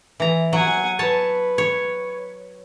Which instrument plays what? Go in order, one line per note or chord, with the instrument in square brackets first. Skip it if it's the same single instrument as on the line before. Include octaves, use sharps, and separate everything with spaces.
[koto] E3 A#5
[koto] F#3 [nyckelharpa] F#5 G#5
[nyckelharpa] B4 [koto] C#5 A5
[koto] C#5